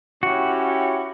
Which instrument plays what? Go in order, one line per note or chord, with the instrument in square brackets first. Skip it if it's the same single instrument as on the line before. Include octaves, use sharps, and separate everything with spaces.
[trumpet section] C#4 E4 G4 [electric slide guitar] F#4